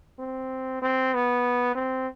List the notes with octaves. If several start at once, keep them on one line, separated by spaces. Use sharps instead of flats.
C4
C4
B3
C4